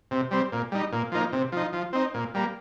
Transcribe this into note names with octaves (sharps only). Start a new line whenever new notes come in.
C3
G3 C4
A#2
G3 D#4
A#2
F3 A#3 D#4
C3
F3 D#4
F3
C4 D#4
A#2
G3 A#3